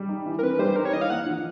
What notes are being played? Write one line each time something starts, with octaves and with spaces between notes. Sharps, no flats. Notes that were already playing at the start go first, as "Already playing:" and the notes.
Already playing: G3
D#4
E3
A#4
C4 B4
G3 C5
D#4 A#4
C#5
E3 D#5
F5
A#3 F#5
F3